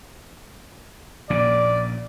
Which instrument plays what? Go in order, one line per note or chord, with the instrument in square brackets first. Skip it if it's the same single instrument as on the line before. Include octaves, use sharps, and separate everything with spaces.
[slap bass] A#1 A#2 C#3 [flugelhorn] D5